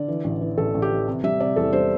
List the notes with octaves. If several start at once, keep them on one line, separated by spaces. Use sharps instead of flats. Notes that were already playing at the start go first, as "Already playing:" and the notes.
Already playing: D3 D5
E3
A1
E3
A1 A4
A1
G4
E3
C3
G3 E5
C3 D5
E2 A4
G3 C5